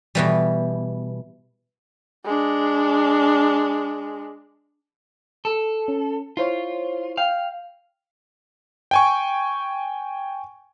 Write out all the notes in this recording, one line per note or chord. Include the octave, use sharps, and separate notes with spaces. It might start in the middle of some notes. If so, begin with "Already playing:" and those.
B2 E3 G3
G#3 D4
A4
C#4
E4 F4 C5 C#5
F5 G5
G5 G#5 C#6